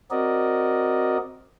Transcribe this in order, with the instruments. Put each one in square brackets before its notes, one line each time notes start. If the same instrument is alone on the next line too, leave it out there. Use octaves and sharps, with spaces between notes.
[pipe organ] C4 F#4 A#4 D5 D#5